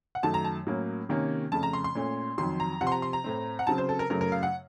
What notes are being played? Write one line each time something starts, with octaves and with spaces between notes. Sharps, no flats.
F#5
F#2 D#3 F#3 A3 A5
A#5
A5
A2 F#3 A#3 C#4
C3 D#3 A#3 C#4
F2 C#3 A3 A5
A#5
C6
C6
A#2 A3 C#4
F2 D#3 F#3 C6
A#5
C3 F3 C4 F#5
C6
A#5
C6
A#5
A2 A3 C4
F#5
C#3 F#3 C4 A5
C5
A4
A#4
F#2 C#3 F#3 A3 A#4
A#4
F5
F#5